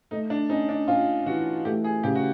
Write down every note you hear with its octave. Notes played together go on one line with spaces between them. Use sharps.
A3 D#4
D4
C#4 D#4
D4
C#4 F4
E3 F#4
A3 G4
G#4
C#3 G4
F#4